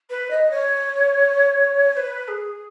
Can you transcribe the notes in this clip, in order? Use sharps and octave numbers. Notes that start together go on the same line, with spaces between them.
B4
D#5
C#5
B4
G#4